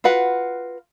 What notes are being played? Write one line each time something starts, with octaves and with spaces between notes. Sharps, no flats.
F4 F#4 B4 F#5